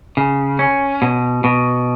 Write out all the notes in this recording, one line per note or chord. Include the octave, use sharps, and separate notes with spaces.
C#3
C#4
B2
B2